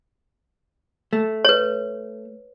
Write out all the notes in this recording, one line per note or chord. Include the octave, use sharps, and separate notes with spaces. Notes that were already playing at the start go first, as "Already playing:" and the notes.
A3
B4 C#5